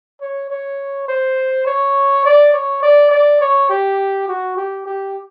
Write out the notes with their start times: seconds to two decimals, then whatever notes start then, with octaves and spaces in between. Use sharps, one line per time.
0.21 C#5
0.50 C#5
1.08 C5
1.66 C#5
2.25 D5
2.53 C#5
2.82 D5
3.11 D5
3.41 C#5
3.70 G4
4.28 F#4
4.57 G4
4.86 G4